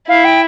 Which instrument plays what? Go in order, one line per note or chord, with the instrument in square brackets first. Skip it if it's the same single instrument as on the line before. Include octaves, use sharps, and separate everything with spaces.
[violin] E4 [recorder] F5
[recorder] G5